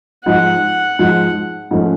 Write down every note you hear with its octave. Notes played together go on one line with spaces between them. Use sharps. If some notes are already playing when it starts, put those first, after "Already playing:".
G#2 F3 G#3 F#5
G#2 F3 G#3
G#2 F3 A3 C#4